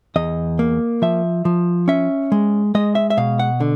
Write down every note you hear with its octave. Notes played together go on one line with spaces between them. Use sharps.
E2 D#5
A#3
F3 E5
F3
C#4 E5
G#3
G#3 D#5
E5
E5
B2 F5
F#5
D3